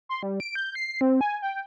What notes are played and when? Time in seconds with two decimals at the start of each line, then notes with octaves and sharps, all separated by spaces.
0.09 C6
0.23 G3
0.40 D7
0.55 G6
0.75 C7
1.01 C4
1.21 G#5
1.42 G5